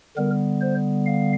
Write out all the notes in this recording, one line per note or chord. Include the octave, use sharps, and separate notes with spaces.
D3 G3 B3 A#4
C5
F5